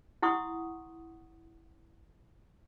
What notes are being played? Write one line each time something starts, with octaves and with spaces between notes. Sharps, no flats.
E4 F#5 C6 C#6 D#6